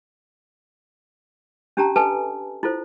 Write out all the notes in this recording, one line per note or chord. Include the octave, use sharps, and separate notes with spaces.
C#4 D4 G4 A5 A#5
A4 B4 D#5 G#5 A5
E4 F4 A4 C5